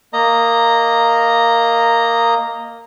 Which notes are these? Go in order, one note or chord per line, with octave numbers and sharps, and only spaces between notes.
A#3 D#5 A#5